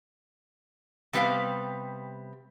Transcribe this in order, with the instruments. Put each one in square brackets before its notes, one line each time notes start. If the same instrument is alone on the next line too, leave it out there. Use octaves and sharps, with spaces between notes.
[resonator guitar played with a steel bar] C3 G3 B3 G4 F5